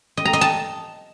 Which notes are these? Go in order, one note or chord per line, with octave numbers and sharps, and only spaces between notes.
D#5
A#5
D#5
A5